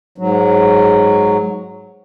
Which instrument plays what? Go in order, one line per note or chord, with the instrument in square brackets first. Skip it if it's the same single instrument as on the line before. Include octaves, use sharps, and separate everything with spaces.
[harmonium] G#2 F#3